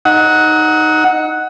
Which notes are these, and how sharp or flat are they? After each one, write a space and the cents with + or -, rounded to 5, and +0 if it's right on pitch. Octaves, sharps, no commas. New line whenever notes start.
D#4 +0 F#5 +0 D#6 +45